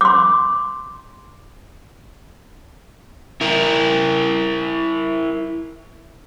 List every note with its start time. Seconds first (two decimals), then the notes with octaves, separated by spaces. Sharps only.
0.01 C6 D6
3.41 E4 A#4